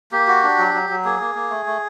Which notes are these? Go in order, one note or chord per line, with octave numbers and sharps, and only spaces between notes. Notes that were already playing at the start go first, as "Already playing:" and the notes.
A#3 G4
F#4
D4
F#3
F#3
F#3
A#3 G#4
A#3
A#3
A3
A3